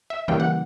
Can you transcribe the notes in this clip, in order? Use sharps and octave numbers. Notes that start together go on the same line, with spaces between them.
E5
C#3 E3 G3 A#3 G5
F#5